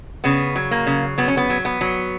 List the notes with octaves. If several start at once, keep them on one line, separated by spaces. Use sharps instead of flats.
C#3 B3
F#3
A#3
C#3
F#3 B3
C#4
B3
F#3
B3
F#3